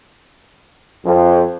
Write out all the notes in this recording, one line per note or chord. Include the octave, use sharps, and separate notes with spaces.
F2